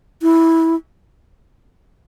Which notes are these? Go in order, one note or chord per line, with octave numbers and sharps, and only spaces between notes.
E4